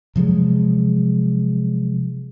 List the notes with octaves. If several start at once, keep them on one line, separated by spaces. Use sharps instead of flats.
C3 F3 F#3 G#3